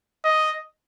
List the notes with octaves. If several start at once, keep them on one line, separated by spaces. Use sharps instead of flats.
D#5